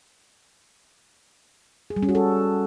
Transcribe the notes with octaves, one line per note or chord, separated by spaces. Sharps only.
G#4
G3
C#4
F#4
A4